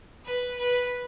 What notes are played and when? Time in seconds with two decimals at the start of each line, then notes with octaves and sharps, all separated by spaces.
0.24 B4
0.58 B4